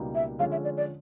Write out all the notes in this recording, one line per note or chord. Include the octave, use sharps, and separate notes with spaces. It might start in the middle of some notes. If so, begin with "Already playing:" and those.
Already playing: C#2 B2 G3 A#3 D#4
E5
D3 F3 G#3 C#4 F5
E5
D5
D5